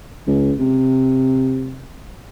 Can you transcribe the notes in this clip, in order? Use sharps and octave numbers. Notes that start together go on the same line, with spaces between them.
C#2
C3